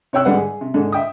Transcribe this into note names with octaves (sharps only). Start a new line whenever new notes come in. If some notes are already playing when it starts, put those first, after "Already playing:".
C3 C#5 G5 E6 F#6
G#2 D3 G3 B4 F#5
G#4
C3
G#2 D3
E5 G5 D#6